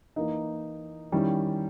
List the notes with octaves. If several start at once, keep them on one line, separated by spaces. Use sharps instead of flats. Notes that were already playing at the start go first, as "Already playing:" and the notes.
E3 A#3 D#4
D#3 G3 C#4 E4